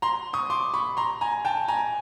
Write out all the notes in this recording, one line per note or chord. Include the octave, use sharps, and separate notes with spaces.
A#5 C6
C#6 D#6
C6 D6
B5 C#6
A#5 C6
G#5 A#5
G5 A5
G#5 A#5